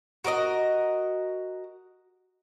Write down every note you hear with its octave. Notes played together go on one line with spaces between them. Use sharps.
F#4 A#4 D5 D#5